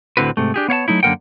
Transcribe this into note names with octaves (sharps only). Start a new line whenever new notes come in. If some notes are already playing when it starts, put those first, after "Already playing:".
D2 A2 D3 C4 F#4 B4
G#2 C3 A3
D4 G4 G#4
B3 C#5 F5 A5
F#3 A3 D#4 E4
F#2 D3 A#3 A#4 F#5 G5